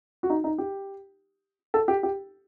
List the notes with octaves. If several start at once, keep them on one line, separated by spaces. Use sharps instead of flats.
F#4
D#4
D#4
G4
A4
G4
G4